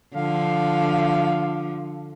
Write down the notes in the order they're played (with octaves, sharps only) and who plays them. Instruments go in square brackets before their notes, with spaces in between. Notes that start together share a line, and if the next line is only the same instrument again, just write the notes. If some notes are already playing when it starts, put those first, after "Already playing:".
[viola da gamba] D3 F3 [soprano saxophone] F5